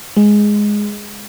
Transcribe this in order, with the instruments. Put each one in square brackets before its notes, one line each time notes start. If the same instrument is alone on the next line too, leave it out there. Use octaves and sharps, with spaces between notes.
[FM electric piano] G#3